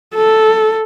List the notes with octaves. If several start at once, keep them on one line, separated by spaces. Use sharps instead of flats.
A4